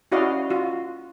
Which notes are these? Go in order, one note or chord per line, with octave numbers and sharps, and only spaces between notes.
C#4 E4 F#4 D5 D#5 F5
F4 F#4